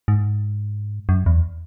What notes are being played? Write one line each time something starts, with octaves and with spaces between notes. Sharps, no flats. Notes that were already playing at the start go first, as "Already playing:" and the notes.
G#2
F#2
E2